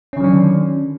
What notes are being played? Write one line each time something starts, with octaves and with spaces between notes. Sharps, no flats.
D3 D#3 F#3 C#4 D4